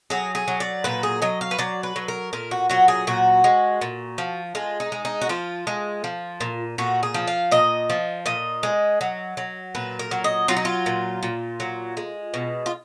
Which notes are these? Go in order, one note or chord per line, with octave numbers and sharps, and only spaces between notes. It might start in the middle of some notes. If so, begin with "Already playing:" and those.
F#3 G#4
G#4
F#3
D5
A#2 B4
G#4
F#3 D#5
F5
B4
F#3 D5
B4
F#3
A#4
A#2 A#4
F#4
F#3 F#4
G#4
A#2 F#4
G#3
A#2
F3
G#3 F4
D#4
G#3
D#4
F#4
F3 F4
G#3
F3
A#2
A#2 F#4
G#4
F3
F5
A#2 D#5
F3
A#2 D#5
G#3
F#3
F#3
A#2 B4
A#4
F#3
D#5
F#3 F4
D#4
F4
A#2
A#2
F#3
G#3
B2
F4